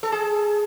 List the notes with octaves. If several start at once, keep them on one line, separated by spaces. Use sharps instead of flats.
A4
G#4